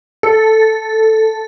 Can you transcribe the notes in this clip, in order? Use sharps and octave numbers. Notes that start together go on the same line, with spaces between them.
A4